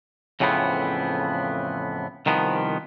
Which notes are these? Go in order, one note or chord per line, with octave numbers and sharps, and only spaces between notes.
F2 A2 C#3 E3 B3 C4
C2 D#3 F3 B3